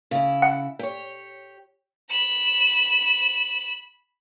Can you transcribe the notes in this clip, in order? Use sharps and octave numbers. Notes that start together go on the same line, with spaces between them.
C#3 E4
F#5
G4 C#5
B5 E7